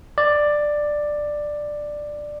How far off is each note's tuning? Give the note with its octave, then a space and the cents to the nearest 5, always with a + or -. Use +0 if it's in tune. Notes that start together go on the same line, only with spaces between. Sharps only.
D5 +10